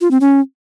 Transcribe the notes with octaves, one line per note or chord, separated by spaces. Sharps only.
F4
C4
C#4